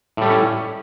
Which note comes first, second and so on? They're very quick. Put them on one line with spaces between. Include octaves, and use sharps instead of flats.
A2 G3 A3 C#4